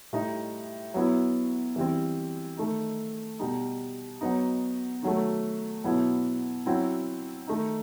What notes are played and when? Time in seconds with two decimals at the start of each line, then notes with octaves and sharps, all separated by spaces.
0.13 A2 G3 D#4
0.94 F#3 B3 E4
1.76 E3 G3 C4
2.57 D#3 A3 D#4
3.39 B2 G3 D#4
4.21 F#3 B3 D#4
5.02 D#3 F#3 A3
5.84 B2 F#3 B3 E4
6.66 F#3 C4 E4
7.47 D#3 A3 D#4